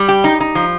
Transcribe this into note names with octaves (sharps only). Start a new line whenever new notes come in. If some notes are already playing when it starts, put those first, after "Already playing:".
Already playing: G3
G4
D#4
D#4
F3